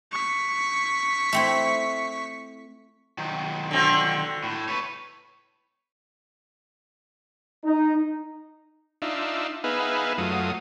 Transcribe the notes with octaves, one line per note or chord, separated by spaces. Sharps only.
C#6 B6
A3 C4 E4
D#3 F#3
D3 C4 F#4
A2
B4 C#5
D#4
D4 D#4 F4 E5
B3 D#4 G#4 B4 E5 F5
F#2 F#3 A3 F4 D#6